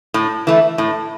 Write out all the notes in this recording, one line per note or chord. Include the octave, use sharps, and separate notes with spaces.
A2
E3 A3
A2